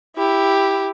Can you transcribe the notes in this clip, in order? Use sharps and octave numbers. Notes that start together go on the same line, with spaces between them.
E4 G4